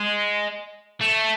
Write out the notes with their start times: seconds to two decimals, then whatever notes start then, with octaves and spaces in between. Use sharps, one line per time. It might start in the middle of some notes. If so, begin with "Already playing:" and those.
Already playing: G#3
1.01 A3